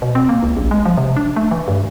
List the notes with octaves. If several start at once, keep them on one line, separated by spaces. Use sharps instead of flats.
B2
C4
A#3
C#2
A#1
G#3
F3
C3
D4
A3
E3
G2